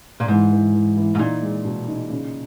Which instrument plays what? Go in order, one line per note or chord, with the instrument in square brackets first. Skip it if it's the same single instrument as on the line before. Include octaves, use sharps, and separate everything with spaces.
[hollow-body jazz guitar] A#2
[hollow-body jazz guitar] G#2 [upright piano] E3
[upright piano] E3
E3
E3
[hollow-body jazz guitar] G#2
[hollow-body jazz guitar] A#2 [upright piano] D#4
[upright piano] G#3
B2
D#4
C#3